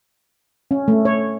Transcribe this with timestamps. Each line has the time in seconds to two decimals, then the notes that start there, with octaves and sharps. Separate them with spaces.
0.71 C#4
0.88 A3
1.05 C#5